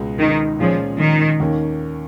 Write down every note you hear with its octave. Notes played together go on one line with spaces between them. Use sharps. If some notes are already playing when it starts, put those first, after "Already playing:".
Already playing: C#2 B2 G#3
D#3
A#2 F3 G#3 C#4 G#4 C#5
D#3
D#2 D#3 A#3 C#4